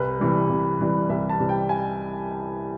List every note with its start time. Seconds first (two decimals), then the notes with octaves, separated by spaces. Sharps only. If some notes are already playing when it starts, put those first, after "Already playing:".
Already playing: C2 B4
0.20 C3 E3 G3
0.49 C2
0.79 C3 E3 G3
1.09 C2 E5
1.29 A5
1.39 C3 E3 G3
1.49 G5
1.69 G#5